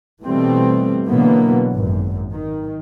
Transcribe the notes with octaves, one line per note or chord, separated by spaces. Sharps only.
B2 E3 G3 A3 C4
B2 D3 E3 F#3 A#3 B3
G#1 F#2
D#3